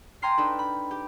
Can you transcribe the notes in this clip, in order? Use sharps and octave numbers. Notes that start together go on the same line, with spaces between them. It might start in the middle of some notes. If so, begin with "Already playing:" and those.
G5 G#5 A#5 C6 F6 C7
D4 D#4 A4 B4
B5
G4